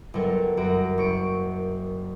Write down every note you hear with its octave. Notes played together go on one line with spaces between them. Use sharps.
G1 F#3 A4 A#4
F#2 F#4 A#5 D7
F#1 C#6 D7